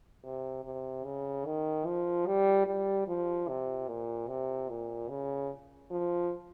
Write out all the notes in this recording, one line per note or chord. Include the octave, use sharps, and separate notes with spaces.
C3
C3
C#3
D#3
F3
G3
G3
F3
C3
A#2
C3
A#2
C#3
F3